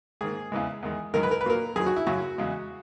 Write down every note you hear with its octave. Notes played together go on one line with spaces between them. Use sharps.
G#2 D#3 A#3 G#4
E2 C#3 E3 G#3
E2 D#3 G#3
F#2 D#3 G#3 A#4
B4
A#4
B4
A#2 F#3 A#3 A#4
F#2 D#3 F#3 G#4
F#4
E4
F#2 C#3 F#3 F#4
E2 C#3 G#3